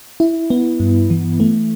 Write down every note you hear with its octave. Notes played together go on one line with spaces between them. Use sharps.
E4
B3
G2
E3
A3